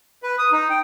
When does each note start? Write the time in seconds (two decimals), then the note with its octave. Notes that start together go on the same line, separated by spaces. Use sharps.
0.23 B4
0.39 D#6
0.52 D#4
0.70 G5